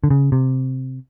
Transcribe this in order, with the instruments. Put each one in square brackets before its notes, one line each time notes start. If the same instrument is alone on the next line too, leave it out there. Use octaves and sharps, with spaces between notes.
[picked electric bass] D3
C#3
C3